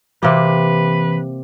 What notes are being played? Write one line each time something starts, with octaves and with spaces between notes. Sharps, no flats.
C3 E3 A#3 G4 B4